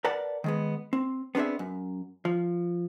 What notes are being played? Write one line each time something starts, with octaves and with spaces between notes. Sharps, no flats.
A#4 B4 D5 F#5 A5
D#3 G#3 B3
C4
B3 C4 D4 G#4 E5
F#2
F3